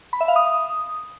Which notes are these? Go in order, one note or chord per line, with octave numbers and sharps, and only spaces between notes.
B5
E5
F5
D#6